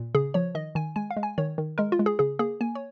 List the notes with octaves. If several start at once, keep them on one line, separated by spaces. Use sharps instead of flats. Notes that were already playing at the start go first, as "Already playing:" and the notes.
Already playing: A#2
C#3 G#4
F3 C#5
D#3 D#5
D#3 G#5
G#3 G#5
F5
G#3
G#5
D#3 C#5
D#3
G#3 A#4
F4
G#3
G#4
C#3 G#4
A#3 G#4
A#3 G#5
C#5